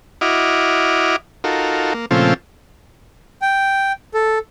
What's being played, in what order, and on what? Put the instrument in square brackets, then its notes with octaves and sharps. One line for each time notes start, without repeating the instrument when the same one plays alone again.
[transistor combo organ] E4 F#4 D#5 D6 F6
D#4 F4 F#4 A4 A#4
A#3
A#2 C#3 F3 A3 C4 F4
[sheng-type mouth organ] G5
A4